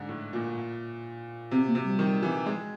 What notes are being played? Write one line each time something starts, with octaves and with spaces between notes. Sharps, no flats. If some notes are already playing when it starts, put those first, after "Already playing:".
Already playing: G#2 D3
A2
A#2
C3 C4
A#3
C3
G3
D#3
E3
G#3